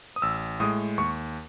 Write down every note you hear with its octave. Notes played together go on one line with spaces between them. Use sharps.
D#6
A1 E6
A2 G#3 D#6
D#2 C#6